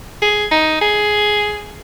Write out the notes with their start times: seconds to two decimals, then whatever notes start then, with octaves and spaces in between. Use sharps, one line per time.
0.22 G#4
0.51 D#4
0.81 G#4